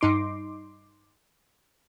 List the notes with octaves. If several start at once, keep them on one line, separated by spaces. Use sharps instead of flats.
G2 D#4 C6 D6